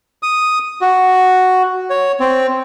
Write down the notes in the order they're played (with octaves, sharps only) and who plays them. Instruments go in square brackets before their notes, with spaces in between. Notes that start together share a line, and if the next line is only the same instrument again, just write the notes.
[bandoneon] D#6
F#4
C#5
C4